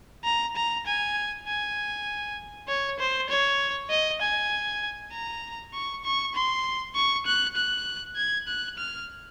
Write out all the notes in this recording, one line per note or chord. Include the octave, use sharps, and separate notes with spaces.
A#5
A#5
G#5
G#5
C#5
C5
C#5
D#5
G#5
A#5
C#6
C#6
C6
C#6
F#6
F#6
G#6
F#6
F6